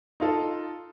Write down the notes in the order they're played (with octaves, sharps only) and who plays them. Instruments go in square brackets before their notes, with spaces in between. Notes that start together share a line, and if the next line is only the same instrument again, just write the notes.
[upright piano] D#4 F4 A4